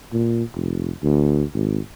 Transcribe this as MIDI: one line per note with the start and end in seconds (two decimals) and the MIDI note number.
0.13 0.43 46
0.55 0.91 29
1.03 1.43 38
1.54 1.79 32